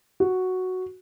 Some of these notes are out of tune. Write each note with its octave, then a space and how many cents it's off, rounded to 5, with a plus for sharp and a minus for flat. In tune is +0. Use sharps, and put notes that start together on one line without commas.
F#4 +0